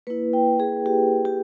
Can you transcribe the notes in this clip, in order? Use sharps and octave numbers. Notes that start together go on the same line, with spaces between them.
A#3 E4 B4
G5
G#4
G4
G4